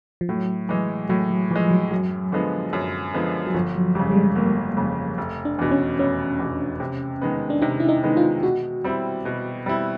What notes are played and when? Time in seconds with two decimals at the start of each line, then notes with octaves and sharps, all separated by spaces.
0.21 F3
0.29 A2 F#3
0.69 E3 G#3
1.09 A2 F#3
1.30 F#3
1.51 E3 F3 G#3
1.71 F#3
1.91 F#2 F#3
2.32 D3 F3 G#3 B3
2.73 F#2
3.14 D3 F3 G#3 B3
3.47 F#3
3.54 G1 F3
3.75 F#3
3.95 F2 C#3 G3
4.11 G3
4.16 G#3
4.36 G1 A#3
4.77 F2 C#3
5.18 F1
5.45 D4
5.59 E2 B2
5.71 C#4
5.99 F1 C#4
6.39 E2 B2
6.80 C3
7.21 D#3 G#3 B3
7.50 D4
7.62 C3 D#4
7.80 E4
7.89 D#4
8.03 D#3 G#3 B3
8.17 F4
8.43 B2 F#4
8.84 G3 C4 E4
9.25 B2
9.66 G3 C4 E4